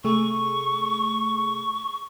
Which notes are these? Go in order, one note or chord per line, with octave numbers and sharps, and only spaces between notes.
C3 A3 G#4 C#6